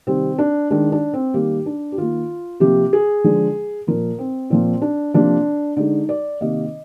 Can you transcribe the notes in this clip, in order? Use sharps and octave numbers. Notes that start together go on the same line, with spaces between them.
C3 D#3 G3 C4
D4
D#3 G#3 D4
D4
C4
D#3 G3 A#3 G4
D4
G4
D#3 A#3 F4
C3 F3 A#3 G4
G#4
D3 F3 G#3
A#2 F3 A#3 A#4
C4
A#2 F3 A#3 C4
D4
C3 F3 A#3 D4
D3 G#3 D#4
D5
C3 D#3 A#3 D#5